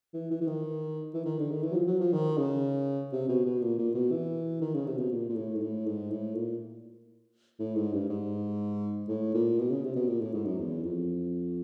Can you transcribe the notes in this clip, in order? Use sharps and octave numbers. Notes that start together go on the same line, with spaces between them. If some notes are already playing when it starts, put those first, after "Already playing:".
E3
E3
E3
D#3
E3
D#3
D3
D#3
E3
F#3
F3
F#3
F3
D#3
C#3
C3
B2
B2
A#2
A#2
B2
E3
D#3
C#3
C3
B2
A#2
A#2
A2
G#2
A2
G#2
A2
A#2
A2
G#2
G2
G#2
A2
A#2
B2
C#3
C3
B2
A#2
A2
G#2
F#2
E2
F2